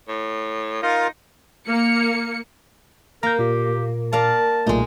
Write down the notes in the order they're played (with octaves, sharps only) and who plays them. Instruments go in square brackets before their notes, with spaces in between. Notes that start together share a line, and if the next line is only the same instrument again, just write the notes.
[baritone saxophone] A2
[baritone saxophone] D#4 [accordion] F4 A#4 F5
[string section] A#3 C#7
[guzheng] A#3 [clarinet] A#4 [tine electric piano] A#5 G6
[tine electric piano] A#2 [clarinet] G4
[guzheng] A#4 D5 F5 [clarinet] A5
[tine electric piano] B1 A#2 A3 [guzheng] G#3 D#4